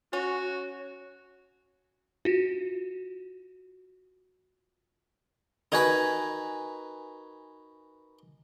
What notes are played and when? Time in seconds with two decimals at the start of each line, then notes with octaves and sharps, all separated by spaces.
0.13 C#4 F#4
2.25 F4 F#4
5.72 D#4 F#4 A#4 B4 G#5